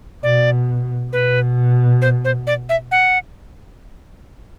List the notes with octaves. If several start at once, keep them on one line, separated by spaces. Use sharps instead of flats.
B2 D5
B2 B4
C5
C5
D5
E5
F#5